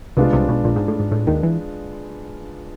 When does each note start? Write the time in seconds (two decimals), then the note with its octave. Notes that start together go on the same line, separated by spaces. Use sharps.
0.17 C2 C3 G#3 B3 D4 F4
0.33 C2 C3
0.48 B1 B2
0.64 A#1 A#2
0.76 G#2
0.88 A2
1.00 G#2
1.11 A2
1.27 D#2 D#3
1.43 E3